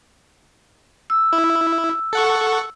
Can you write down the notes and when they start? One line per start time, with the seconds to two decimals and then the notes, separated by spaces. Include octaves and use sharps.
1.10 E6
1.33 E4
2.13 A4 F#5 C#6